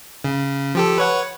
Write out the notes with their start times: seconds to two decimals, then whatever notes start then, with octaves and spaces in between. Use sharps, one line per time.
0.24 C#3
0.75 F3 G4 A4
0.98 B4 C#5 F#5